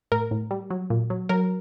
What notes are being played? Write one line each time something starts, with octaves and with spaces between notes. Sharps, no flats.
A2 A#4
A2
G3
F#3
A#2
F#3
F#3 A#4